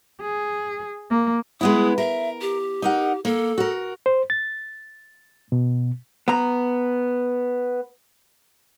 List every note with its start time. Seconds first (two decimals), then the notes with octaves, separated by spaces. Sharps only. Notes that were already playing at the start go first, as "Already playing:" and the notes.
0.21 G#4
1.10 A#3
1.61 G#3 B3 E4 D#6
1.98 A#4 E5
2.41 G4
2.82 D#4 A#4 F#5
3.25 A#3 A4
3.58 F#4 A#4
4.06 C5
4.30 A6
5.52 B2
6.28 B3 A#5